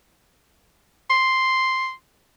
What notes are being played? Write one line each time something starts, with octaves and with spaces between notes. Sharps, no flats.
C6